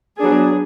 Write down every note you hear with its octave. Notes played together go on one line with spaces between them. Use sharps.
F#3 B3 D4 G#4